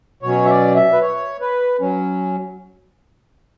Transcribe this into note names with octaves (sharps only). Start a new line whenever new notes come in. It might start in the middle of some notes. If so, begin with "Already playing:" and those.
B2 F#3 C#4 C#5
E5
D5
E5
B4
C#5
B4
F#3 C#4